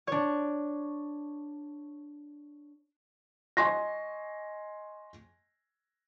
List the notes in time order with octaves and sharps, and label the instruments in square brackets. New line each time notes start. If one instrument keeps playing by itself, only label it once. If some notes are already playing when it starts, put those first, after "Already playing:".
[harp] D4 C#5
[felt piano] D#5 G#5 C6 C#6 A#6